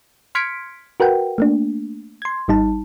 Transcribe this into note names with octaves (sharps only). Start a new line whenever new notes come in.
C6 F6 G#6 B6 C#7 D7
F#4 A#4 B4 F#5 G5
A3 A#3 D4
C6 G#6
G#1 G3 D#4 A5